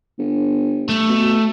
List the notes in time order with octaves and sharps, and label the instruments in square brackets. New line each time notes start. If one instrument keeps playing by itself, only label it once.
[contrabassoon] G1
[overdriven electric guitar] A3
[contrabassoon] B2